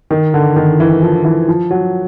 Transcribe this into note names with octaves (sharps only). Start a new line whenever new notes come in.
D#3
D3
D#3
E3
F3
E3
F3
F#3